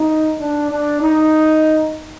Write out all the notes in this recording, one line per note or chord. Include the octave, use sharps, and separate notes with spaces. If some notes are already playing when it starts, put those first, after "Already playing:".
Already playing: D#4
D4
D4
D#4